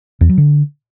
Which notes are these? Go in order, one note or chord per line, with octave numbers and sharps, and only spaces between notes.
E2
F#3
D3